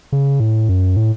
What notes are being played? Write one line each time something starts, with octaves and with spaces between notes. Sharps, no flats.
C#3
A2
F#2
A2